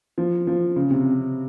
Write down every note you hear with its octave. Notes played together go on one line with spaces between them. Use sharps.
F3
F3
C#3
C3